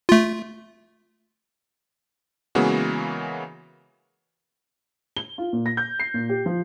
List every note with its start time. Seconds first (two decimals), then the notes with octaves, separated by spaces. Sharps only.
0.09 A3 F4
2.55 C#3 E3 G#3 A#3 B3 F#4
5.17 G7
5.38 F4
5.53 A#2
5.66 A#6
5.77 G6
5.99 C7
6.14 A#2
6.29 G4
6.46 F3